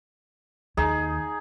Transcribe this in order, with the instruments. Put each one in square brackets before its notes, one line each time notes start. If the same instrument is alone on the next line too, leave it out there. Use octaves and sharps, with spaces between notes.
[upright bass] D#2 [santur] D#4 G#4